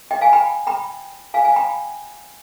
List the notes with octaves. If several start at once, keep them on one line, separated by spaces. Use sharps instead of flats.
D#5 G5
F5 G#5
G5 B5
G5 B5
F5 G#5
F5 G#5
G5 B5